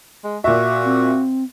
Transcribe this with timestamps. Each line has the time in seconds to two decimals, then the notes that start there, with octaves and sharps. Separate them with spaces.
0.24 G#3
0.44 A#2 F#4 E5
0.84 C4